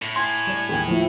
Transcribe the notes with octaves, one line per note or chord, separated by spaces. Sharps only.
A2
G#5 C6
G3 D5 E7
D#2 G#3 G#4
F3 A3 E4